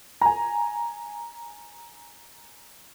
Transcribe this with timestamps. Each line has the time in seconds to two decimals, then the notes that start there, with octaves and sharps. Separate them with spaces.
0.21 G#5 A#5